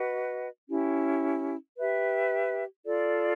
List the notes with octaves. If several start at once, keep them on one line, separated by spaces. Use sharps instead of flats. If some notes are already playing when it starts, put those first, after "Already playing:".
Already playing: F#4 B4 D#5 F#5
C#4 E4 G4
G4 B4 E5
F4 A4 D5